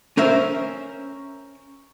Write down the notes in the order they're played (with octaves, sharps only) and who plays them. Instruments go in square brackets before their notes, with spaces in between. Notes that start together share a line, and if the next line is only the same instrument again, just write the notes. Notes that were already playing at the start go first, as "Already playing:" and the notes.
[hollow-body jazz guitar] C#4 A#4 C5 E5